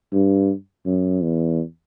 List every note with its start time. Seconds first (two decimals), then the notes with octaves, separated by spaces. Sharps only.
0.12 G2
0.86 F#2
1.22 E2